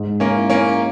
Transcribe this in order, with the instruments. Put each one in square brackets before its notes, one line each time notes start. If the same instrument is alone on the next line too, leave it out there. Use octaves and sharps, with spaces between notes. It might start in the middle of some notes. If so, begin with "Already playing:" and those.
Already playing: [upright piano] G#2
[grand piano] A#3 C#4
[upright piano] E4
[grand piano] A#3 C#4